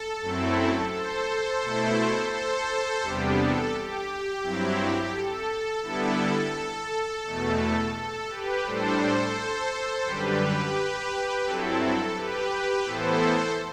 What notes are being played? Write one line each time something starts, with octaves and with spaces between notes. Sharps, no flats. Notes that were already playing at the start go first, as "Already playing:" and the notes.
Already playing: A4
F#2 F#3 A3 C4 E4
A4 C5
B2 A3 E4
A4 C5
E2 C3 G3 B3 D4 G4
A4
G4
G2 F#3 C4 E4
A4
D3 G3 B3 E4 A4
E2 B2 A3
A4
G4 B4
A2 G3 D4 A4 C5
F#2 D3 G3 G4 B4
G2 F#3 C4 E4 A4
A4
G4 B4
A2 E3 B3 E4 A4 C5